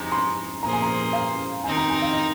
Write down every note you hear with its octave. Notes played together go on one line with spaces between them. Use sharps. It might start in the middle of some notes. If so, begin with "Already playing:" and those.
Already playing: F2 C3 G#3 D#4 A#5
C6
A#2 F3 A#3 G#4 C5 A#5
G#5
A#5
F5
D#3 C4 D#4 A#4 G#5
A#5
G#5
F5
D#5